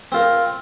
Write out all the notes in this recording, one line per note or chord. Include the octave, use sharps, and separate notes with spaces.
C4 F4 A#4